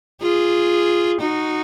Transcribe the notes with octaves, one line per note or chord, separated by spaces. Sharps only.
F4 G#4
D#4 F#4